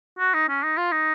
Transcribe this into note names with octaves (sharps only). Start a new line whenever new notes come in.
F#4
D#4
C#4
D#4
F4
D#4